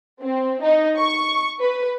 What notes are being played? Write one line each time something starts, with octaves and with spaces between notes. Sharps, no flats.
C4
D#4
C#6
B4